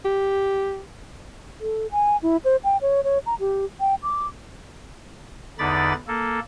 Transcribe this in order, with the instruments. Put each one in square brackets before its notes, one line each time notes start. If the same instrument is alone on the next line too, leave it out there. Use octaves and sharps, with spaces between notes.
[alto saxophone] G4
[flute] A4
G#5
E4
C5
G5
C#5
C#5
A#5
G4
G5
D6
[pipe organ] E2 D3 D#4 D5 B5 A6
A#3 A4